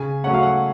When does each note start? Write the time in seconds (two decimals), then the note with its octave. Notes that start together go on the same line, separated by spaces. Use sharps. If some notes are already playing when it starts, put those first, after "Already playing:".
Already playing: C#3 G#5
0.24 F#3 A3 C#4 F#5
0.34 F5
0.43 F#5